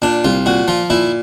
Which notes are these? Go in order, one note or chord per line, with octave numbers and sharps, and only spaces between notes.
A#2 D4
C2 F4
A#2 F#4
F3 F4
A#2 E4